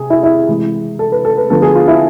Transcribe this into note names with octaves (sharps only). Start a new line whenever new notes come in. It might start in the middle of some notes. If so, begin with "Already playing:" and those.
Already playing: C3 G#4
E4
E4
C3 E3 G#3
A4
B4
A4
B4
D3 F3 B3 A4
G#4
F4
E4